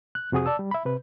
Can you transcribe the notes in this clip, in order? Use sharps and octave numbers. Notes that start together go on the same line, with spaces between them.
F#6
F2 C3 F#4 G#4 D#6
D5 A5 E6
G3
E5 B5
C3 B4